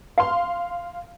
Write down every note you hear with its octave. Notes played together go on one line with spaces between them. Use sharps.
F5 C6